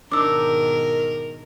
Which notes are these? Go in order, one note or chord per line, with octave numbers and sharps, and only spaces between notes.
G#2 B2 D#3 D4 D#4 A#4 D6 E6